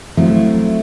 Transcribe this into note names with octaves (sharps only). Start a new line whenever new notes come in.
F3 F#3 A3 C4 E4